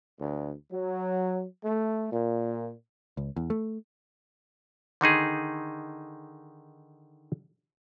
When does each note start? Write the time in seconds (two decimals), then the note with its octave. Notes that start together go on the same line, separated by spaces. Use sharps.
0.20 D2
0.72 F#3
1.65 A3
2.12 A#2
3.17 C#2
3.37 E2
3.50 A3
5.01 D3 D#3 D#4 G#4